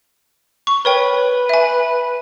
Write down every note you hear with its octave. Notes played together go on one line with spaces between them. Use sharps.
C#6
A#4 B4 C#5 G5
E5 G#5